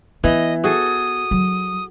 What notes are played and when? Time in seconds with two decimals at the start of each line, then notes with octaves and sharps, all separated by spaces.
0.24 E3 B3 D#5
0.64 F#4 G#4 A4 D#6
1.31 F#3